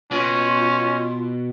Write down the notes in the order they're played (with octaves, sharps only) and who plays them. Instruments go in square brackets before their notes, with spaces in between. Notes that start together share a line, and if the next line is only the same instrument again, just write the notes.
[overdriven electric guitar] B2 [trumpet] C#4 [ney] F4